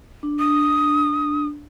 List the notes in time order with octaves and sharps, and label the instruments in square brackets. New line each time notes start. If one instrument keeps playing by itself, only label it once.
[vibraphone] D4
[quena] D#6